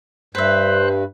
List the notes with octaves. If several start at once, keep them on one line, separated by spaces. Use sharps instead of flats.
G2 B4 C5 E5 F#6